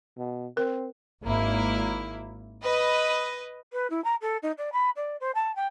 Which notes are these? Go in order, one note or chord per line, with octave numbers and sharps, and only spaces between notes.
B2
C4 A#4
G#1 A#3 E4
B4 D#5
B4
E4
A#5
A4
D#4
D5
B5
D5
C5
A5
G5